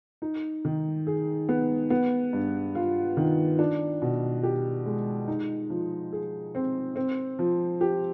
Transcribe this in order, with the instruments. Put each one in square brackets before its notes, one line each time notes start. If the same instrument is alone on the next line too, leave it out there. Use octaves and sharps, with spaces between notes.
[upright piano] D#4
D#3
G#4
B3
B3
G2
F4
D#3
D4
B2
G4
G#3
D#4
F3
G#4
C4
C4
F3
G4